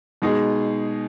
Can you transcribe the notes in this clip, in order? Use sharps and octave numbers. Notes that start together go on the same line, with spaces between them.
B2 G#3 D#4 G#4